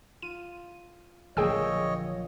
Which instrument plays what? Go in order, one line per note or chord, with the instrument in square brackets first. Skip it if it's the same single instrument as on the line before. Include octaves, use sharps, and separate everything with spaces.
[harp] F4 [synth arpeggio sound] D#7
[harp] A#1 [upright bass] D3 F#3 [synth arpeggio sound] G#4 G5 E6 [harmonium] C#5 D#5